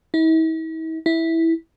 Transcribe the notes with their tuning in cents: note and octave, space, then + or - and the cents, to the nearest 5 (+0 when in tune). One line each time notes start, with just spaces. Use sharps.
E4 -45
E4 -10